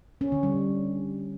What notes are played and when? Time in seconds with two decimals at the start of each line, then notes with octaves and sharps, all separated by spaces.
0.21 C#4
0.32 D3
0.43 G3